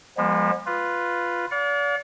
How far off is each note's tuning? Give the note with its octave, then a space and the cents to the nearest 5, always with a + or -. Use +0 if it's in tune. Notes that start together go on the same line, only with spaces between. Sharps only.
F3 +5 G#3 -30 B3 -40
F4 +0 B4 +0
D5 -40 F5 +45